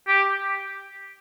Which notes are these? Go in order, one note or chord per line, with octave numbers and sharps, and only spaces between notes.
G4